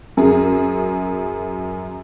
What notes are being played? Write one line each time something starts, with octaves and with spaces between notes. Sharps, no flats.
F#2 G#4